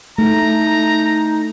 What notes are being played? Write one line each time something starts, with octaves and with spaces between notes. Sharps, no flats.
A3 D#4 A#5